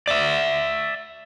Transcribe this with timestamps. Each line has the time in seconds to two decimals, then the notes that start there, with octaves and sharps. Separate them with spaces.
0.08 D5 E5